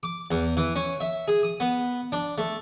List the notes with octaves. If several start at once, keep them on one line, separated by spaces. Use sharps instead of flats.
D6
E2
E3
C#4
E5
G#4
D#6
B3
D4
A3